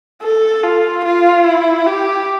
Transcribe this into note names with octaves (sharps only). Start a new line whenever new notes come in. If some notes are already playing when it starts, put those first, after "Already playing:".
A4
F4
F4
E4
G4